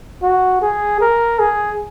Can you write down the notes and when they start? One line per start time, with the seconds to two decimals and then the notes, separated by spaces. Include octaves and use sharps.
0.23 F#4
0.62 G#4
1.01 A#4
1.39 G#4